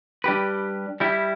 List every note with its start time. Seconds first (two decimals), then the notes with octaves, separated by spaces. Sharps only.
0.24 G3 D4 G4 B4
1.00 G3 E4 G4